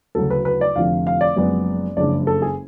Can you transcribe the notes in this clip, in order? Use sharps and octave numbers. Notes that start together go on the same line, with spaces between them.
D2 C#3 F#3 A4
B4
B4
D5
F1 F2 D3 F3 F5
F5
D5
F#1 F#2 F3 G#3 B3 D5
F#1 F2 C#3 G#3 D4 D5
A4
G#4